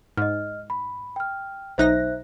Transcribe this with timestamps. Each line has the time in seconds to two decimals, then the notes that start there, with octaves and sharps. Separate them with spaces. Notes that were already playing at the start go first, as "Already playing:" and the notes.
0.17 G#2 D#5 F6
0.70 B5
1.16 G5 F6
1.78 B1 D#4 C5 E5 F#6 A#6